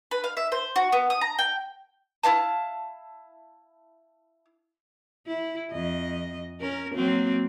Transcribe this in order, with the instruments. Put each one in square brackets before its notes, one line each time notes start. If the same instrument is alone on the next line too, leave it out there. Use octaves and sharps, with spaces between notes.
[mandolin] B4
F5
E5
C5
F#4
B3
D#6
A#5
G5
E4 D5 F5 A5
[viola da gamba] E4
F2 D#5
C#4 A#4
F#3 A#3 C4